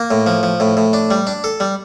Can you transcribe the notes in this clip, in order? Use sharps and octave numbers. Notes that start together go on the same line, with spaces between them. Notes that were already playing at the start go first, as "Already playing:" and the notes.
Already playing: A#3
A2
F3
F3
A2
A2
D4
G3
D4
A4
G3